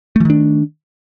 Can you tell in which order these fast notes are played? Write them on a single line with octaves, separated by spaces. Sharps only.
A3 E3 D#3 D4